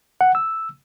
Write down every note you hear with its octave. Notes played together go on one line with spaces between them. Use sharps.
F#5
E6